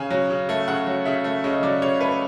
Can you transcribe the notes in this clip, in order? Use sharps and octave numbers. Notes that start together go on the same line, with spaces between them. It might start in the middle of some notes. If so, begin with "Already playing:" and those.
Already playing: C#3 G#5
F#3
C#3
A3
C#3 F#5
F#3
C#3 E5
A3
C#3 D#5
F#3 D5
C#3 C#5
A3 B4